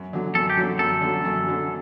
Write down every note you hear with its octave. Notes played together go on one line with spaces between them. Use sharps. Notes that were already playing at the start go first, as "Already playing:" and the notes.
Already playing: F#2
D3 F#3
F#2 A4
G4
D3 F#3
F#2 A4
D3 F#3
F#2
D3 F#3